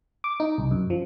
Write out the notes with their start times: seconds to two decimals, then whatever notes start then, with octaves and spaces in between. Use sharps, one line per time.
0.24 D6
0.40 D#4
0.58 C2
0.71 F#2
0.90 F3